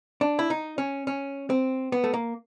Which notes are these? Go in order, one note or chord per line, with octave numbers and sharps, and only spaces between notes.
D4
E4
D#4
C#4
C#4
C4
B3
A3
A#3